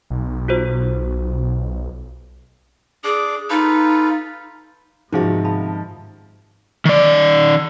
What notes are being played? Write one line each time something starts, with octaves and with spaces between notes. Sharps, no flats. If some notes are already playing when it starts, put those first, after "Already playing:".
B1
F4 F#4 C5
D4 G#4 D6
D#4 F4 A4 B4
G#2 C3 D#3 F3 C#4 F#4 G#4 F5
F5 A5 B5
D#3 D5